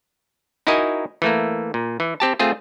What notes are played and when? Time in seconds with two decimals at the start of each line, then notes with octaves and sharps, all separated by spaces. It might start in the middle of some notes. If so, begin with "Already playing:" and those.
0.67 D#4 E4 F#4 A#4 D#5 G#5
1.22 E3 A3 A#3
1.74 A#2
2.00 E3
2.20 C4 G4 A5
2.39 A3 C4 F4 G#4